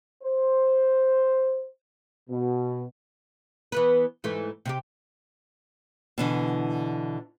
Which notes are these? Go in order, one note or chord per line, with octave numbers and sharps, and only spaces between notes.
C5
B2
E3 B3 B4
G#2 E3 A3
C3 D#4 G4
B2 D3 E3